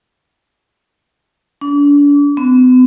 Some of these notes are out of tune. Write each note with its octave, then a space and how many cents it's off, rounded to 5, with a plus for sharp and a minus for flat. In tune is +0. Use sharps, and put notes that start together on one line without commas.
D4 -35
B3 +45